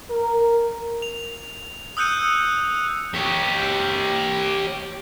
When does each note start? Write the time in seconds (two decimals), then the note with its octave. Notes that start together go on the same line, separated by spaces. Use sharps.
0.10 A#4
1.02 F7
1.97 D#6 E6 F#6 G6 C#7 D#7
3.15 G4 C#5